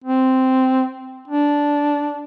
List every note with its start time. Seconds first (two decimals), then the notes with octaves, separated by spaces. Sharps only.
0.04 C4
1.28 D4